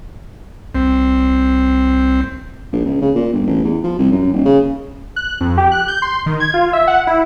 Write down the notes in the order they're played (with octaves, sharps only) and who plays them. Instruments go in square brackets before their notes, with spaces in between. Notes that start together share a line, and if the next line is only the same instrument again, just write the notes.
[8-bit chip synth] C2 [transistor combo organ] C4
[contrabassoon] A#1
C#2
C#3
A#2
G1
A1
E2
F3
C2
F#2
D#1
C#3
[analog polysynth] F#6
F2
G4
F#6
G6
C6
D#3
G#6
F4
E5
F#5
E4